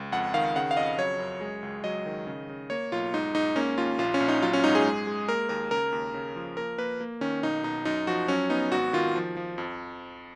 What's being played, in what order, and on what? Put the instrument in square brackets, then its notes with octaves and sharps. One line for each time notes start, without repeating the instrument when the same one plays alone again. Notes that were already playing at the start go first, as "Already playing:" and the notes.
Already playing: [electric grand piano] C#2
F2 F#5
D#3 F5
C#3 F#5
F5
F2 D#5
F#3 C#5
F#2
G#3
C#2
F#3 D#5
D#3
C#3
C#3
A#3 C#5
B1 F4
G#2 D#4
G#2 D#4
A#3 C#4
D#2 F4
A#1 F4
C#4
A#1
D#4
F#3 F4
C#4
G#2 D#4
G#4
G#3
G#3
A#3 A#4
D#2 A#4
C#3 A#4
D#2
C#3
F3
A#3 A#4
A#3 B4
A#3
D#3 C#4
B1 D#4
B2 D#4
F#2 D#4
F3 F#4
F#3 C#4
B3 D#4
G#1 F#4
D#3 F4
F3
F3
F2